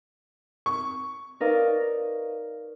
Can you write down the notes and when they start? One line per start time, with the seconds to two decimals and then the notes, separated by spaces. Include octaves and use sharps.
0.66 C#6
1.40 D#4 A#4 B4 D5 D#5 F5